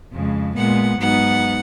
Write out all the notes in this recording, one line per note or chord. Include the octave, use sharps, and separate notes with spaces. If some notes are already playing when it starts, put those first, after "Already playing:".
F2 C#3 G#3
A#2 G#3 B3 F#5
G#2 F#3 B3 D#4 F#5